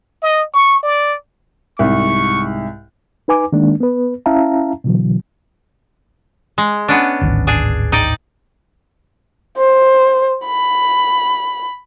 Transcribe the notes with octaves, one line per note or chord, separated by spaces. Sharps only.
D#5
C#6
D5
C2 G#2 C#6
D#4 B4 G#5 D6
D#3 G#3 A#3 D4
B3 B4
C#4 E4 E5 F5 A5 A#5
B2 D3 E3 F#3
G#3
B3 C#4 D4
D1 G#1
D4 G#4
D#4 D5 G5
C5
B5